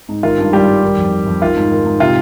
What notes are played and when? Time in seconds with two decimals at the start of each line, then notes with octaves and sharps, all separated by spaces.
0.09 G#2
0.23 D#3 F4
0.38 G2
0.53 D#3 G3 G4
0.68 G2
0.83 D#3
0.97 F2
1.11 D#3
1.26 F2
1.41 D#3 F4
1.56 G#2
1.71 D#3
1.86 G#2
2.00 C3 F4